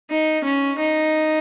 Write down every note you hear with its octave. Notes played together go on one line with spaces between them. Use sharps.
D#4
C#4
D#4